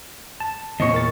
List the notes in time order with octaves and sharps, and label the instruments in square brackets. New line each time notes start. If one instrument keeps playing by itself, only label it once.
[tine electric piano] A5
[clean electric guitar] E2 A#2 C#5 [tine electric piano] D#5
[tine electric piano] A#4 A6